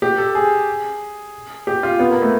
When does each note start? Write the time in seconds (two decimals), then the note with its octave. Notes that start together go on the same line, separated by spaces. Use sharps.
0.02 G4
0.18 A4
0.35 G#4
1.67 G4
1.83 F4
1.99 B3
2.11 A#3
2.22 A3